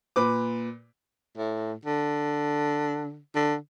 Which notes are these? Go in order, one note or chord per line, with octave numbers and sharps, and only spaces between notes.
A#2 B4 D6
A2
D3
D3